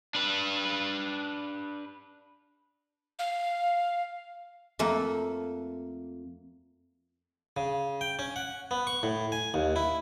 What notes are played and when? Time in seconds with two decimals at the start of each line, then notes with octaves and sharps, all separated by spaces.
0.15 D4 B4
3.19 F5
4.79 F2 A3 A#3 A4
7.57 C#3
8.01 G5
8.19 C#4
8.36 F#5
8.71 B3
8.87 C#6
9.03 A2
9.32 G#5
9.54 D#2
9.76 E4